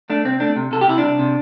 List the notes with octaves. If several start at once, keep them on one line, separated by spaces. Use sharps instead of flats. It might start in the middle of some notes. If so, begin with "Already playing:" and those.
A3 D4
C2 C4
A3 D4
C3
C3 A4
G4
C3 E4
C2 D4
C3